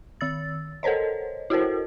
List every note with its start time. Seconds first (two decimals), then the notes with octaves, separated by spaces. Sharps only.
0.21 D#3 E6 A6
0.83 A4 A#4 C5 C#5 D#5
1.50 E4 F#4 A4 A#4 C5